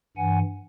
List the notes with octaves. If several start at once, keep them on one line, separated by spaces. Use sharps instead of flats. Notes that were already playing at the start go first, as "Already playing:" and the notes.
G2 E3 F#5 G#5